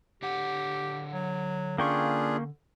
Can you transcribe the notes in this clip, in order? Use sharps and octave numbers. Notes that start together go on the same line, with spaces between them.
D3 G4 C#5 F#5
F#3
A#3 C#4 D4 F4 G#4 G5 C#6